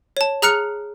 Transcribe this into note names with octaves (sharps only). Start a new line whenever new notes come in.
C#5 A5
G#4 A#5 F6 F#6 C#7